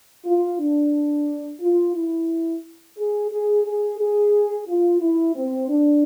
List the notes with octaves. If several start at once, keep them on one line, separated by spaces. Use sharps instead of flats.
F4
D4
F4
E4
G#4
G#4
G#4
G#4
F4
E4
C4
D4